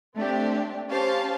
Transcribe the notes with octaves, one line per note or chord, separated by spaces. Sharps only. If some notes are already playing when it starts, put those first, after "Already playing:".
A3 C4 D4 G4
C#4 G4 C5 F5 A5